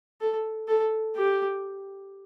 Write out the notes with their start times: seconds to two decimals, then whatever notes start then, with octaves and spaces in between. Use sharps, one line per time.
0.21 A4
0.68 A4
1.16 G4